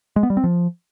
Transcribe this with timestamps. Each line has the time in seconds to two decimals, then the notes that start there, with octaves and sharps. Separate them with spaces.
0.16 G#3
0.23 B3
0.30 G3
0.37 C4
0.44 F3